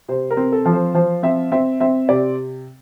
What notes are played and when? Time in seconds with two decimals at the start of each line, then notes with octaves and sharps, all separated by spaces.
0.08 C3 C5
0.30 A#4
0.37 C4
0.52 A4
0.66 F3
0.73 C5
0.94 F3 C5
1.23 C4 E5
1.52 C4 E5
1.80 C4 E5
2.09 C3 D5